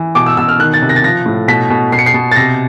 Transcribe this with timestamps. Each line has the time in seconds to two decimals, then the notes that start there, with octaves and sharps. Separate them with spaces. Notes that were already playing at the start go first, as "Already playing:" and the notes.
Already playing: E3
0.15 B2 D6
0.26 E6
0.37 B2 E6
0.49 F6
0.59 D#3 F#6
0.74 A6
0.82 C3
0.89 A#6
0.96 A6
1.04 F3 A#6
1.26 A2
1.48 B2 B6
1.70 B2
1.92 B2 C7
1.99 C#7
2.06 C7
2.14 B2
2.31 A6
2.36 C3 A#6